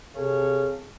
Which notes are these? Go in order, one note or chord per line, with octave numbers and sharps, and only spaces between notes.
C3 G#4 A4 C#5 F5